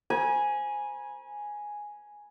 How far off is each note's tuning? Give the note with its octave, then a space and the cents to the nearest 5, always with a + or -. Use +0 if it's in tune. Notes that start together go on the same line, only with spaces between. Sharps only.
G#5 +0 B5 -45